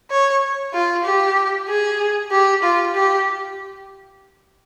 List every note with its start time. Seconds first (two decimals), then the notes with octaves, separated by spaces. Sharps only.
0.10 C#5
0.73 F4
1.04 G4
1.69 G#4
2.31 G4
2.63 F4
2.95 G4